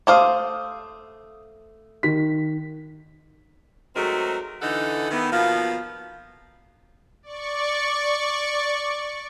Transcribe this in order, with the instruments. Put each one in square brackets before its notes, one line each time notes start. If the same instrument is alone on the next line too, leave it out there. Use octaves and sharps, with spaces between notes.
[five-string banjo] A3 C5 F5 [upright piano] D6 D#6
[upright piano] D#3 B6
[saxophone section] G#2 F#3 A3 C4 D#4 A#4
D3 E3 D#4 A4 F#5
D#3 E3 B3
B2 F3 A#3 B3 F5
[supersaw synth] D5 C#6